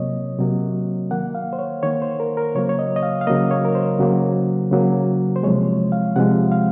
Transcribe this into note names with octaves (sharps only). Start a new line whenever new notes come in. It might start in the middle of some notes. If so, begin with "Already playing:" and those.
Already playing: C3 F#3 A#3 C#5 D#5
C3 F#3 A#3
D#3 A#3 F#5
F5
C5
C#5
D#3 A#3 C#5
C5
A#4
A#4
C#3 F#3 A#3 C#5
C#5
D#5
D#5
F5
F5
C#3 F#3 A#3 D#5
C#5
A#4
C5
C#3 F#3 A#3
C#3 F#3 A#3
C5
C3 F3 G#3 C#5
F5
C3 F3 G#3 F#5
F5